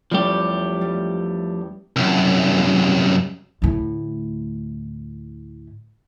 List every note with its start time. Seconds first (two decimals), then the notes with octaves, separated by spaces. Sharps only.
0.12 E2 F3 G3 A3 C#4 G4
0.81 G3
1.96 C2 F#2
3.62 D2 A2